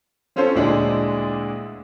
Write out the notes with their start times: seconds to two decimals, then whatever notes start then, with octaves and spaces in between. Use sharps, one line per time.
0.36 C4 C#4 F4 A4 C5 C#5
0.55 D2 A#2 G#3 D4 E4 G#4